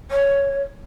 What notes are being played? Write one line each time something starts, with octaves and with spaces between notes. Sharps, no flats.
C#5